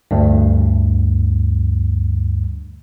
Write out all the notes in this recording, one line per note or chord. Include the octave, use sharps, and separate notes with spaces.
D2 G2